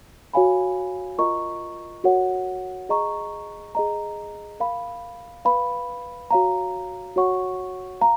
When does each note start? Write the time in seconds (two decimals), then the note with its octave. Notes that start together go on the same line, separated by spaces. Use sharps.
0.34 F#4 C#5 F5 G#5 B5
1.18 F4 A#4 D#5 A#5 C#6
2.04 F#4 A#4 C#5 F#5
2.89 G#4 D#5 A#5 C#6
3.75 G#4 D#5 A#5
4.60 A#4 F5 B5
5.45 B4 F5 B5
6.31 F#4 C#5 F5 A#5
7.16 F#4 C#5 F#5 C#6
8.01 F5 A#5